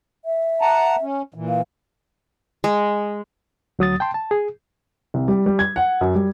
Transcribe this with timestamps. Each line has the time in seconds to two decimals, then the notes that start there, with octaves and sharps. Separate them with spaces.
0.25 E5
0.61 F#5 A5 A#5
1.02 C#4
1.34 A#2 E3
1.48 F5
2.64 G#3
3.79 D2 F#3 D#6 A6
4.00 G5 A5 C6
4.14 A5
4.31 G#4
5.14 C2
5.28 G3
5.46 G3
5.59 G#6
5.76 F#5
6.01 F#2
6.15 G3